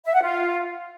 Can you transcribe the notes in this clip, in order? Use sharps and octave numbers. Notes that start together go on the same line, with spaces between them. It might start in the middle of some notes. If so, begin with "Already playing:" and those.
E5
F#5
F4